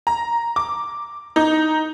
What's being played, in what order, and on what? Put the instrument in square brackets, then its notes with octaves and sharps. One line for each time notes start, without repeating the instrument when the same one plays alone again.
[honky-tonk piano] A#5
D6
D#4